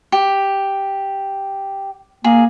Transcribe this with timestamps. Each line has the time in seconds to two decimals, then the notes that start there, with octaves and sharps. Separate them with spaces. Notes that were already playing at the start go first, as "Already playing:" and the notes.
0.12 G4
2.24 A#3 G#4